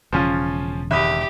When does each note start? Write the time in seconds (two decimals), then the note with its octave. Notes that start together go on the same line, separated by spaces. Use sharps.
0.13 E1 C#3 F3 C#4 F4
0.91 G#1 G4 E5 B5 D#6